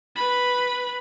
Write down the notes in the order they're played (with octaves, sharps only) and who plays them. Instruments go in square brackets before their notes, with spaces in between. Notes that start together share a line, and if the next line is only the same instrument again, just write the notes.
[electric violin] B4 B5